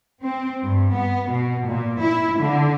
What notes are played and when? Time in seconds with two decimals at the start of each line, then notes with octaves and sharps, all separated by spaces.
0.23 C4
0.65 G2
0.95 B3
1.30 B2
1.67 A#2
2.02 E4
2.41 D3